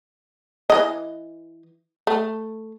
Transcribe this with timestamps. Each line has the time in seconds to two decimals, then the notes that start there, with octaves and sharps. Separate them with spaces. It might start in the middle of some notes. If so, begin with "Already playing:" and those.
0.70 E3 D#5
2.07 A3